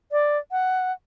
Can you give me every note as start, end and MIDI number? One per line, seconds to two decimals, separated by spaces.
0.12 0.38 74
0.52 0.92 78